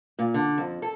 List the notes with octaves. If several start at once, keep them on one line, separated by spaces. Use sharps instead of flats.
A#2
D3
F2
A4